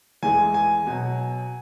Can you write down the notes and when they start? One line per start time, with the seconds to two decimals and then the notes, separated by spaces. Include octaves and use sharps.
0.23 E2 E3 G#3 G#5
0.54 G#5
0.87 B2 F#3